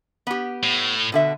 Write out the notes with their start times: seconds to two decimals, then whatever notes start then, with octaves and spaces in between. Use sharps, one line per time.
0.27 B3 G4
0.63 A2
1.12 B2 D3 E5